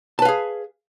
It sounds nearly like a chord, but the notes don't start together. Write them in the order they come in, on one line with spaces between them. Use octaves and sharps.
A5 B4 F5 G#4